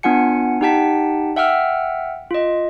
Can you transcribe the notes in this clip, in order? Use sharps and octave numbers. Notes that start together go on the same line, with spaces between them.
B3 D4 F4 F#5 G#5 C#7
D#4 G4 F#5 G5 A5 B6
E5 F#5 G5 E6 F6
F4 D#5